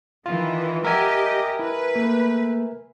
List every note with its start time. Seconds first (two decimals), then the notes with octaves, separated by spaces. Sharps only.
0.26 D#3 E3 F4
0.85 G4 A#4 D#5 E5 F#5 G#5
1.59 E4 B4
1.95 A3 A#3 A4